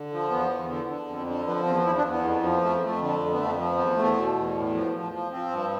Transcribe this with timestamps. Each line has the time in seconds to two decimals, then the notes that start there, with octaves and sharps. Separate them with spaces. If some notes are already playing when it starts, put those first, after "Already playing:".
Already playing: D3
0.12 F3
0.31 E2 B3
0.51 E2
0.69 D3
0.89 D3
1.08 F2
1.27 D3
1.46 F3 B3
1.66 E2 C4
1.85 E2 E4
1.98 D4
2.04 E2
2.11 B3
2.24 F2
2.42 F3
2.62 F2 A3
2.81 F2 A3
3.01 D3
3.19 F2
3.33 B3
3.39 F2 A3
3.58 F3
3.77 E2 B3
3.96 E2 A3
4.16 B2
4.35 E2
4.55 A2
4.74 F3
4.93 F3
5.12 F3
5.32 F3 C4
5.50 G2